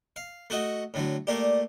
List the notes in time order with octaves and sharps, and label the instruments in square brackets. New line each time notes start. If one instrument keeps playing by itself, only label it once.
[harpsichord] F5
A3 F#4 D#5
A2 D3 F#3
[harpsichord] A3 A#3 G4 [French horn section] D5